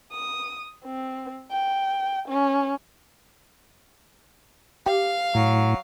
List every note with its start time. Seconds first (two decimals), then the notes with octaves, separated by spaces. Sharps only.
0.12 D#6
0.85 C4
1.52 G5
2.28 C#4
4.86 G4 F5
5.35 A2 F#3